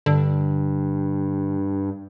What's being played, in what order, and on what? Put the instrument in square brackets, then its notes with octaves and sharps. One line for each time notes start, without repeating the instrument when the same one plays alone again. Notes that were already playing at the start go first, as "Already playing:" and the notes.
[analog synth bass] G2 [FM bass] D3